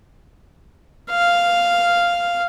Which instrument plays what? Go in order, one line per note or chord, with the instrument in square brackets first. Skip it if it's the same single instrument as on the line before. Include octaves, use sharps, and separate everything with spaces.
[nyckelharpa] F5